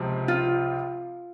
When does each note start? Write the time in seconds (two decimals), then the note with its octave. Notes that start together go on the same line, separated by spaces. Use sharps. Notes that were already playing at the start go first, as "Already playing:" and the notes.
Already playing: C#2 C3 F3 C4
0.28 F4